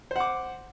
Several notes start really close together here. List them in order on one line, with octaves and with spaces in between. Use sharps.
C5 F#5 D6